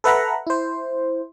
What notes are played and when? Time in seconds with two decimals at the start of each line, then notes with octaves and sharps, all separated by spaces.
0.04 A4 B4 E5 F#5 A#5 B5
0.47 E4 C5